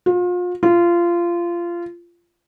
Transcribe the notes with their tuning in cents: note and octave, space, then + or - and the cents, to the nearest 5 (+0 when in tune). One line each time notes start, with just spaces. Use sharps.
F4 +35
F4 -20